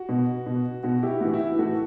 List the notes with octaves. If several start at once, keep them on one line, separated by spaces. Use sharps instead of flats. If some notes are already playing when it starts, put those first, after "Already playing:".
Already playing: F#4
B2
B2
B2 F#4
E4 G4
A2 E3 F#4
E4
A2 E3 F#4 A4